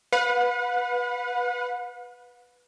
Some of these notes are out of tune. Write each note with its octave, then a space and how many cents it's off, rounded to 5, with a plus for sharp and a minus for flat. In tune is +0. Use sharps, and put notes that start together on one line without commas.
B4 +0 F#5 -45